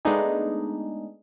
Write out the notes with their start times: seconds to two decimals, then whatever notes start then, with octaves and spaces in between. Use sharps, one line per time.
0.05 G#3 A3 B3 D4 D#4 G#4